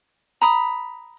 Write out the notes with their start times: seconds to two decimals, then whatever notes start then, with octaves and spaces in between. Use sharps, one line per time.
0.41 A#5 B5 D#6